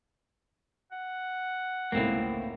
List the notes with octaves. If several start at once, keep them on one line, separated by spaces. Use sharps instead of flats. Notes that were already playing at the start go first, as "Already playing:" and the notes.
F#5
G#1 C#2 A2 A#3 C4